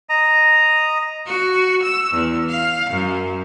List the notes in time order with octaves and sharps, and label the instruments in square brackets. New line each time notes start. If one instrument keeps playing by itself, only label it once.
[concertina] D#5 A#5
[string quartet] F#4
E6
E2
F5
F#2